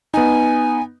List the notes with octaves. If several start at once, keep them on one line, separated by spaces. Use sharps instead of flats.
B3 D#4 G#5